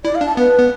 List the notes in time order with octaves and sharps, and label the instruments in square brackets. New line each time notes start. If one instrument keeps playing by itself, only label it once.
[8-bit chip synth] E4 [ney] D5
[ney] F5
[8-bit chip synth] D4
[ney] A5
[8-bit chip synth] B3 [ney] B4
[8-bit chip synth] B3